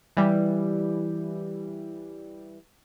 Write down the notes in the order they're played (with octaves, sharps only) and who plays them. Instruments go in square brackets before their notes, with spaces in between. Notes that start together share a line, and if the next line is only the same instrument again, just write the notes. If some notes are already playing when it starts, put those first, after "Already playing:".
[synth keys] E3 G3